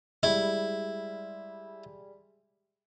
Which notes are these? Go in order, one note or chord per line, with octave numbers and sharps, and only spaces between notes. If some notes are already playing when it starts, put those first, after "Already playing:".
G3 G#3 E4